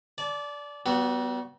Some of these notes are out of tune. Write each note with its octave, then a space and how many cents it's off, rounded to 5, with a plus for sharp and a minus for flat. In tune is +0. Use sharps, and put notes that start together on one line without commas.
D5 -15 A5 -35
G3 -40 B3 +0 F#4 -10